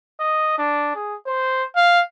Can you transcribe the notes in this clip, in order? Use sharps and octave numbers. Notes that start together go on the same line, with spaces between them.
D#5
D4
G#4
C5
F5